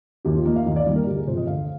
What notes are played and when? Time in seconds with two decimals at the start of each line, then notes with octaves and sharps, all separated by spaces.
0.25 D#2 G4
0.35 F4
0.45 D#3 A#3 D#5
0.56 F5
0.66 D#2 D#5
0.76 D5
0.87 D#3 G3 A#3
0.96 A#4
1.06 D2 G4
1.17 G#4
1.27 C3 F3 C5
1.37 D#5
1.47 D2 F5